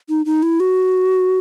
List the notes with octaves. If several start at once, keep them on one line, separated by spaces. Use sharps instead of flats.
D#4
D#4
E4
F#4